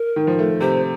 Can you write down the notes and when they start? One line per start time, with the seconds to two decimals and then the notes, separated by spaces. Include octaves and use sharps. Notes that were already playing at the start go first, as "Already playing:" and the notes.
Already playing: A#4
0.16 D#3
0.27 F3
0.39 A3
0.60 C3 C5